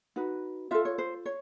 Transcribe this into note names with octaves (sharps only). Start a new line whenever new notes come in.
D#4 F#4 B4
F4 A4 E5
C#5
C5
C#5